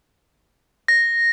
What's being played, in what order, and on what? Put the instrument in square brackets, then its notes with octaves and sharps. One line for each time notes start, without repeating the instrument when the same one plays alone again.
[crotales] A#6